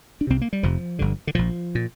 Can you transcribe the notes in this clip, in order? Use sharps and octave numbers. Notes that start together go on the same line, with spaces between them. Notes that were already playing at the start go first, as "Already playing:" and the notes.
D4
C2 C3 C4
A#3
G3
F1 F2 C3 F3
G1 G2 D3
D3
A#1 A#2 F3
A#2